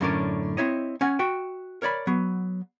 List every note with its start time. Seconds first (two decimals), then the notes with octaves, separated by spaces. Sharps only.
0.01 F#2 A2 D3 C#4 A#4 D5
0.57 C4 E4 C#5 D#5
1.01 C#4 F#5 G#5
1.19 F#4 E5 G5
1.82 A#4 C#5 D5 B5
2.07 F#3 B3